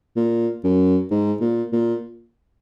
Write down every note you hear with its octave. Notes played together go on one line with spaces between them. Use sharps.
A#2
F#2
G#2
A#2
A#2